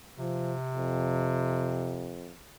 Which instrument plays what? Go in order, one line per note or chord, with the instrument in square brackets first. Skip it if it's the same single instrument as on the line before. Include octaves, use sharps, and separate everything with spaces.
[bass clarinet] C3 [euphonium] F3
[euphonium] F2